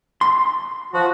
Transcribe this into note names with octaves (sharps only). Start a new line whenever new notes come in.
C6
F3 F#4